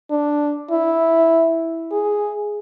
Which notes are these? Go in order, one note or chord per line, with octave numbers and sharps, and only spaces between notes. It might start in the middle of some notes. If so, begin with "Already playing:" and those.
D4
E4
G#4